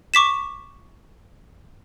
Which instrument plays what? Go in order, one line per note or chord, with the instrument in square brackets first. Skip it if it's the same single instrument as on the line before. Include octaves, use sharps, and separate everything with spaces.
[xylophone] C#6 D6 B6 E7